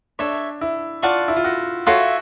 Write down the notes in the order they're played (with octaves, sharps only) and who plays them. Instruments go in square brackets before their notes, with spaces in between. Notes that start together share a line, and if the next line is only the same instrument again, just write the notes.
[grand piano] D4 [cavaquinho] A4 C#5 E5
[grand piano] E4
[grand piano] F4 [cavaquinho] D5 F#5 A5 C#6
[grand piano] E4
F4
F#4
[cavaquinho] F4 A4 C#5 E5 [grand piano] F#4